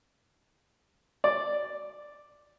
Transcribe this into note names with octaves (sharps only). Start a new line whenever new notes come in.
D5